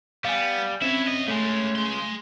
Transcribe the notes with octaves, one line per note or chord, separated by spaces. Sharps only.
G3 B3 F5 G#5
C4 C#4 E4 C#5 E5
D#5
C#3 G#3 A3
G#4 C6